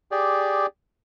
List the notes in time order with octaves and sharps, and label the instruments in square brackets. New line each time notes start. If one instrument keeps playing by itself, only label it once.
[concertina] G4 G#4 D5